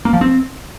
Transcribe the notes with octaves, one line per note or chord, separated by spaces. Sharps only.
A#3
F3
C4